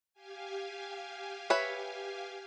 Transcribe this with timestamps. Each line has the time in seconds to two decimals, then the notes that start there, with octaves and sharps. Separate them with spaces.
0.14 G4 F5 G#5
1.50 B4 C#5 E5